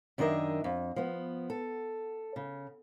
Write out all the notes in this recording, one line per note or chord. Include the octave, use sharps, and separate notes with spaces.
F#2 D#3 D4 A#4 D#5 E5
F2
F3 B3
A4
C#3